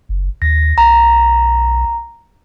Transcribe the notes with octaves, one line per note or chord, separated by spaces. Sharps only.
F#1
D#2 A#6
B1 A#5